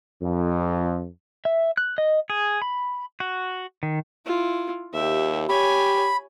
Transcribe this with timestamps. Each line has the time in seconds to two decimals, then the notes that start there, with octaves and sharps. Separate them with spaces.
0.22 F2
1.45 E5
1.77 F#6
1.98 D#5
2.30 G#4
2.62 B5
3.20 F#4
3.83 D#3
4.26 E4 F4
4.94 D#2 G4 E5
5.49 G4 C#5 G#5 B5